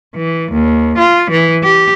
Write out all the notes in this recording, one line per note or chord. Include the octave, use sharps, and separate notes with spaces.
E3
D#2
F4
E3
G4